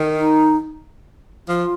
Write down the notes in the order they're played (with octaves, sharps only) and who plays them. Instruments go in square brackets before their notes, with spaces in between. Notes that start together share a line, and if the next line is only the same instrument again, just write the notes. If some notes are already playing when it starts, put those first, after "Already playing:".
Already playing: [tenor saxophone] D#3
[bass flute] D#4
[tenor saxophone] F3 [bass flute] F4